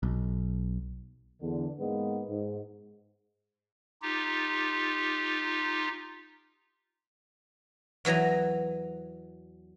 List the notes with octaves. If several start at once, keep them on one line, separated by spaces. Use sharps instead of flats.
B1
E2 D3
G#2 G#3 A#3 B3
G#2
D#4 F4 G4
E2 E3 F#3 D#5 A#5